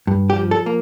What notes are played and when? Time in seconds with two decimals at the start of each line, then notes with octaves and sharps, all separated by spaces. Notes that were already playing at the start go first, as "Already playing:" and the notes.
0.07 G2
0.30 G4
0.36 F3
0.51 A4
0.66 A#3